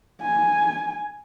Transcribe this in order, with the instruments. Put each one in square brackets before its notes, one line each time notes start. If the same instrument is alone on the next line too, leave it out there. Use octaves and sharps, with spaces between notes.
[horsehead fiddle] G#5